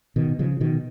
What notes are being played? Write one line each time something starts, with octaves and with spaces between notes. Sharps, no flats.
B2 D#3
C#3 F3
B2 D#3